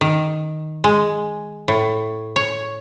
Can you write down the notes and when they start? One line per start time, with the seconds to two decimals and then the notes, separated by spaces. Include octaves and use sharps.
0.01 D#3
0.84 G#3
1.68 A2
2.36 C#5